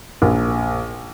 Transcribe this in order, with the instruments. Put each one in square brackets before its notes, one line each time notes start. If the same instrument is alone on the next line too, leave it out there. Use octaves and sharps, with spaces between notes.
[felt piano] A#1